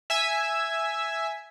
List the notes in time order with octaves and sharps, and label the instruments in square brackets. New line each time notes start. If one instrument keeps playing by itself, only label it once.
[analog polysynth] E5 G#5 E6